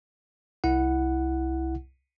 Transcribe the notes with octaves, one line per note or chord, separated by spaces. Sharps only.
C2 E4 F#5